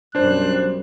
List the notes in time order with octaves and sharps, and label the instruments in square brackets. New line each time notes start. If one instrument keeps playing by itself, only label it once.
[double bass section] B1 F#2 G3 [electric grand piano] D4 C5 [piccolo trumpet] F#6